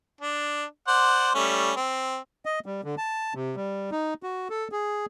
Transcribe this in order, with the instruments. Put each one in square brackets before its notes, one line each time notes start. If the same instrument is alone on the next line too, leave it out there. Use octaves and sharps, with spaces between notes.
[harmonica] D4
C5 D5 F#5
G3 A3 C#4
C4
[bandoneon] D#5
G3
D3
A5
C3
G3
D#4
F#4
A4
G#4